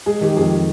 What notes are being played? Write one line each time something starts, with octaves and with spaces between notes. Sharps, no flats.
G#3 G#4
D#3 G4
F2 G#4